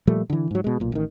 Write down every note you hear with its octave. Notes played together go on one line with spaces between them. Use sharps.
A#2 F3 G3 A3
D3 E3
G#2 F#3
B2 G#3
B1 A#2
A1 D#3